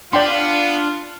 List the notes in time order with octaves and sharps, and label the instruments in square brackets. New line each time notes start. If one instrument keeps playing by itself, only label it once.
[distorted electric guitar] B3 [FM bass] D4 [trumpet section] F4 [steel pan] D5 G5 C6